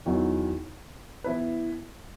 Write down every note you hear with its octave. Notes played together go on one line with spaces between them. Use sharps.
E2 D#3 F#3
E3 B3 E4 B4